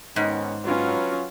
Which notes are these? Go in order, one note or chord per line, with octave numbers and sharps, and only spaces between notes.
G#2 D#3 B3 C#4
F#3 C#4 F4 B4